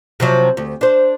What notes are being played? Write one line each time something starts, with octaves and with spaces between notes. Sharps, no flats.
C3 F3 F#3
D2
D4 C5